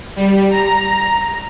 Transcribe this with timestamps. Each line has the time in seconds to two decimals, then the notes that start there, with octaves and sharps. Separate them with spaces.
0.16 G3
0.50 A#5